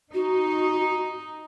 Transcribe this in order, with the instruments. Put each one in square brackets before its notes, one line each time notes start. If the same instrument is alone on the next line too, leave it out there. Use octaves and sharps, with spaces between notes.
[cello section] D#4 [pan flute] F#4